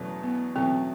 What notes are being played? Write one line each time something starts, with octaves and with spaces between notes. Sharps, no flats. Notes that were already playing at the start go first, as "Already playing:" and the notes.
Already playing: E2 B2 F#3 A3 C#4
B3
E2 B2 F#3 A3 C4 C#4